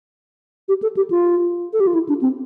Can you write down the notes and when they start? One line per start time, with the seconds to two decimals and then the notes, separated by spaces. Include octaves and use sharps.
0.68 G4
0.82 A4
0.96 G4
1.10 F4
1.73 A4
1.80 G4
1.87 F4
1.94 E4
2.08 D4
2.21 C4